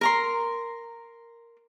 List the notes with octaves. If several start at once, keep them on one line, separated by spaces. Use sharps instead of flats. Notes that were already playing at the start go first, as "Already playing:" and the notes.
A#4 A#5 C6